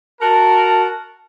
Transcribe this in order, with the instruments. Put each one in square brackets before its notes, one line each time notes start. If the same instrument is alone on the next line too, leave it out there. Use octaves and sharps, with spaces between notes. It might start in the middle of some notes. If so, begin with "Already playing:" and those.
[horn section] F#4 A#4 [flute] A5